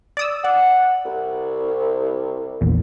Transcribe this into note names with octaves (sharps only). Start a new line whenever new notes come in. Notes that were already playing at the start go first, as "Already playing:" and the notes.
D5 D#6 E6
D5 F#5
C2
A#1 E2